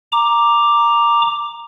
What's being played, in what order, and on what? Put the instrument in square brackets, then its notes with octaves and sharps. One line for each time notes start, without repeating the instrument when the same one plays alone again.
[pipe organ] A#5 D6